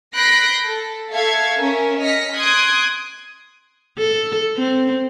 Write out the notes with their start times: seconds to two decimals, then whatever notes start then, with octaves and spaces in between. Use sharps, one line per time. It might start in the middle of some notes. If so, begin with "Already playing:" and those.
0.14 B5 F#6 G6 A#6 C7 D7
0.65 A4
1.11 A4 E5 F5 C#6 G#6
1.58 C#4 A#4 E5
2.01 D#5 F6 A#6 B6 C#7
2.34 C6 D#6 F#6 G#6 D7
3.98 A4
4.58 C4